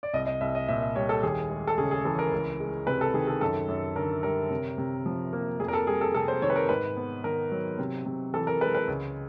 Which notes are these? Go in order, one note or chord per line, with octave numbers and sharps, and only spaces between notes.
D5
C2 D#5
D#5
C2 E5
D#5
A#2 E5
E5
G3 C#5
A4
D#2 G#4
G#3
A4
C#3 G#4
G#4
E3 A4
A#4
C#2
G#3
C3 B4
A4
D#3 G#4
A4
F#2 A4
F#2
D3 A#4
G3 A#4
C3
C3
F3
A#3
F2 G#4
A#4
A4
G3 G#4
A4
C3 A4
C5
D#3 C#5
B4
A#4
G#2 B4
B3
D#3 A#4
F#3
C3
C3
E3 A4
A#4
G#3 B4
B4
C#2